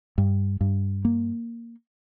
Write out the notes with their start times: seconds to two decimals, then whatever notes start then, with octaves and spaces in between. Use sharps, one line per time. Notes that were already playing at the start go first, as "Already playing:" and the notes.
0.18 G2
0.61 G2
1.05 A#3